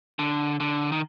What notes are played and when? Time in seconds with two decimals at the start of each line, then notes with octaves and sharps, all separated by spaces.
0.19 D3
0.60 D3
0.92 D#3